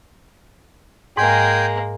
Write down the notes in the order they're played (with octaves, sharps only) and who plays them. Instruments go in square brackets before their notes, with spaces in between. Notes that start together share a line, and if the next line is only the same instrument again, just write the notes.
[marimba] G#2 [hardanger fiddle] G#3 A#3 [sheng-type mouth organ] G5 G#5